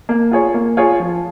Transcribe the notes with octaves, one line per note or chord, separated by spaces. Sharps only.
A#3
F4 G#4 C#5
A#3
F4 G#4 C#5
F3